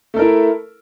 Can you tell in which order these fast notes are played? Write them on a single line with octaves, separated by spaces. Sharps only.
A3 A4 A#4 E4